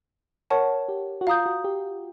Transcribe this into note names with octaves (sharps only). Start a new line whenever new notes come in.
A#4 C#5 F#5 A5 C#6
G4
F#4
F4 F5 A#5 D#6 G6
F#4
G4